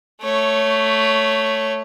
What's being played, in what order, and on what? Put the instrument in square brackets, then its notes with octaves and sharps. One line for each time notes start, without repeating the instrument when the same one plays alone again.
[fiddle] A3 C#5